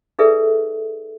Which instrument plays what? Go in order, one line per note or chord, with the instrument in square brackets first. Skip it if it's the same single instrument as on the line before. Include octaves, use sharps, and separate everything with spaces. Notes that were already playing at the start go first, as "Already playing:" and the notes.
[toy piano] D#4 G#4 A4 B4 D5 E5